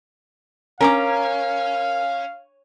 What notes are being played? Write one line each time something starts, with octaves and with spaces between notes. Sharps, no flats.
C#4 A#4 F5 A#5 D6